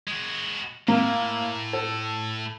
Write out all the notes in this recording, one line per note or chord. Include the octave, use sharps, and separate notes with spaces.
G#3 F#4
A2 A#3
A4